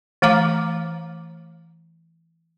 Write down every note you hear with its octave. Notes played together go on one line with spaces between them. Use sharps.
E3 A3 F5 A#5 D6